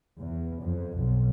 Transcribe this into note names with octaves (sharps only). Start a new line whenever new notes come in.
E2
F2
B1